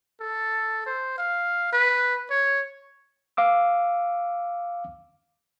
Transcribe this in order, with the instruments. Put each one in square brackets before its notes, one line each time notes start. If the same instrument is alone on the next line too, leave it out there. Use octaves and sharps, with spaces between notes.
[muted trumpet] A4
C5
F5
B4
C#5
[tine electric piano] F5 D6 E6